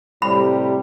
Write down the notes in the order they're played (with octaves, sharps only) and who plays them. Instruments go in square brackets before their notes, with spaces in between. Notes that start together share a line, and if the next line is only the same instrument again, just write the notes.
[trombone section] A2 C3 G3 [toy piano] B5